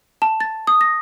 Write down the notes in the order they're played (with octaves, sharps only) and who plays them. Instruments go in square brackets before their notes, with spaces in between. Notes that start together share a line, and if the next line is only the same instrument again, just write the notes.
[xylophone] A5
A6
D#6
A#6